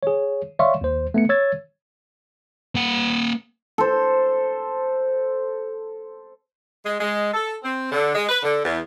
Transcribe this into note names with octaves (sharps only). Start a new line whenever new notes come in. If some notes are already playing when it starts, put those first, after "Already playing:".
G#4 C#5
C#5 D5 E5 F5 C6 C#6
D#2 C5
A3 B3 C#7
C#5 E6 G#6 A6
A#3 F#5
A4 C5
G#3
G#3
A4
C4
D3
G#3
B4
D3
E2